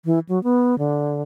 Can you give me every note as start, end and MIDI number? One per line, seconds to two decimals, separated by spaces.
0.05 0.19 52
0.29 0.42 54
0.44 0.78 59
0.78 1.22 50